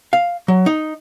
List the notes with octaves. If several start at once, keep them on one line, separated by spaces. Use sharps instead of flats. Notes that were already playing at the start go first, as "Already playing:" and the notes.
F5
F#3
D#4